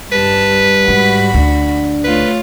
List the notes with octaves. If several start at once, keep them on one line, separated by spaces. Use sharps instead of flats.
G2 G3 B4 A5
G#2 F#4 B5
D2 D4
A3 F4 B4 C#5